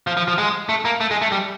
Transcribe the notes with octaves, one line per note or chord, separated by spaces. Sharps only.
F3
F3
F3
G#3
A3
A#3
A3
G#3
A3
G3